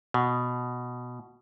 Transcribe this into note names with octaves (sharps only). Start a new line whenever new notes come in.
B2